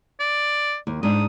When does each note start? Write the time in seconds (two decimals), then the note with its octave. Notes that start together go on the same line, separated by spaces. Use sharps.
0.20 D5
0.87 D#2
1.03 G#2 D4 D#6